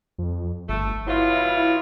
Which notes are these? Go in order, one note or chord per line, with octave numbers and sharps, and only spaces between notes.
F2
G1 A3
B2 F#3 E4 F4